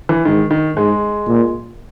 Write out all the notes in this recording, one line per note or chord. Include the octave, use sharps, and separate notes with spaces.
E3
G#2 D#3
D#3
G#2 G#3
A#2